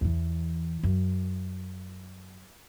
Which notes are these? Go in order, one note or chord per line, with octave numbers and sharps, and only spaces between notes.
E2 E3
F#2